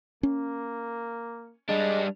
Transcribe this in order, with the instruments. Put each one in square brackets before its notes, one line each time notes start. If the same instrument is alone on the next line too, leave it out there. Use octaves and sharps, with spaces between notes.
[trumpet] A#3 [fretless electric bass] C#4
[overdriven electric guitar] G3 D4 [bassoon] G#3